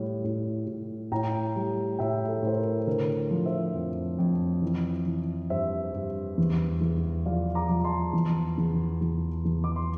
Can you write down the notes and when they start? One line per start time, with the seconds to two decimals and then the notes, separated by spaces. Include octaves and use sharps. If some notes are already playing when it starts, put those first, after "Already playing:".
Already playing: A2 G3
0.24 A2
0.67 A2
1.12 A2 G5 A#5
1.56 G3
1.99 A2 E5 G5
2.28 A4
2.42 A2 C5
2.57 A#4
2.87 D3 A#4
3.31 F3
3.46 C5 E5
3.74 F2
4.19 F2
4.62 E3
5.06 E3
5.50 G2 C5 E5
5.94 G2
6.38 E2
6.81 E2
7.26 F3 D5 F5
7.55 A#5 D6
7.69 F3
7.84 A5 C6
8.13 E2
8.58 E2
9.01 E2
9.45 E2
9.64 D6
9.76 C6